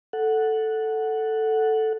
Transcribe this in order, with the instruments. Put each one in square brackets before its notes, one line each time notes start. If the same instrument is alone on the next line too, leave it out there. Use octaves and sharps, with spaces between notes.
[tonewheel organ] A4 F#5